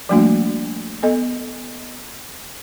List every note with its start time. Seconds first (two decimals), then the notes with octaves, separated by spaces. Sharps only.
0.09 F3 G3 A3 A#3 D4 F#4
1.03 B3 A4 D#5